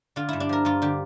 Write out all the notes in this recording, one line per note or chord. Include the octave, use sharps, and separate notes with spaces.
D3 F4
G2 E4
D4
F3 A#4
G2 F4
D3 G4